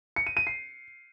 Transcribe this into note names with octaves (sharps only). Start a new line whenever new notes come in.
C#7
D#7
D#7
C7